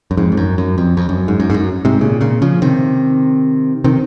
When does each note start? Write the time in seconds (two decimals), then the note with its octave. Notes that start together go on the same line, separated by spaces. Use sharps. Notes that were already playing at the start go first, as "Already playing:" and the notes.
0.11 F#2
0.17 F2 G#2
0.32 F2
0.37 F#2
0.58 F#2
0.78 F2
0.97 F2
1.09 F#2
1.28 G#2
1.40 F#2
1.50 G#2
1.54 F#2
1.85 G#2 C3
2.01 A#2 C#3
2.21 A#2 C#3
2.42 C#3 F3
2.62 C3 D#3
3.84 C3 D#3